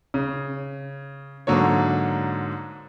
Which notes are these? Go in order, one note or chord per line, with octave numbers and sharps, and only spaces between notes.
C#3
G#2 D3 F#3 A#3 C#5